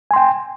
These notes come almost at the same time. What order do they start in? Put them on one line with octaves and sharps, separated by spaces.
G#5 C6 G5